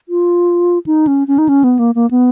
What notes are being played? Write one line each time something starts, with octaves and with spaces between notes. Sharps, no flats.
F4
D#4
C#4
C#4
D#4
C#4
B3
A#3
A#3
B3